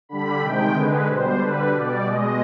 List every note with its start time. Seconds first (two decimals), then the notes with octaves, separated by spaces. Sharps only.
0.09 D3 G3 B5
0.41 C3 D#3 G#3 G5
0.74 D3 G#3 B4
1.07 B2 G3 C5
1.39 D3 G3 B4
1.72 B2 G3 D5
2.04 B2 G#3 D#5